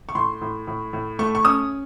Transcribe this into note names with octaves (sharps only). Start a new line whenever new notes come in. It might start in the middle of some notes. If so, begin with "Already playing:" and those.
C#6
A2 C6
A2
A2
A2
A3 C#6
C#6
C#4 D#6